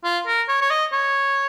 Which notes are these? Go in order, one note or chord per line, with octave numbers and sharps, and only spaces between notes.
F4
A#4
C#5
C#5
D#5
C#5